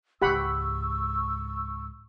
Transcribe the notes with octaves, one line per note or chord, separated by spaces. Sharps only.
C#2 G#2 G4 F#5 B5 C#6 E6